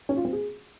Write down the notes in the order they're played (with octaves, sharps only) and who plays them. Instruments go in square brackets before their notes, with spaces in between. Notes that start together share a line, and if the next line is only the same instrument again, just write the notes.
[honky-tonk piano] C#4
F4
C4
G#4